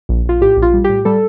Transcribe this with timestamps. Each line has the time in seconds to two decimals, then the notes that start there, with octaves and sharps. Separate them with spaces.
0.09 A#1
0.25 A#1 F4
0.41 A2 G4
0.57 A#1
0.62 F4
0.74 G3
0.84 A2 G4
1.05 G3 A4